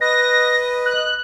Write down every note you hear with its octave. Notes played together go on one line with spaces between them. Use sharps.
B4 D#5 A#6
F#6